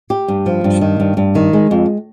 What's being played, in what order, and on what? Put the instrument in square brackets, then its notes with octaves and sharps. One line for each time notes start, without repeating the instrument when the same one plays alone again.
[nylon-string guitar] G4
G2
F3
G2
D#3
G2
G2
D#3
G#3
F2